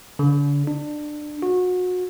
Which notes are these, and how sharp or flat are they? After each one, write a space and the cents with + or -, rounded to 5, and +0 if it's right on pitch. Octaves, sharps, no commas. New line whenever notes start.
D3 -40
D4 +20
F#4 -30